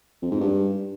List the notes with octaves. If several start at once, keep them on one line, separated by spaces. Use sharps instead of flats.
F2
G#2
G2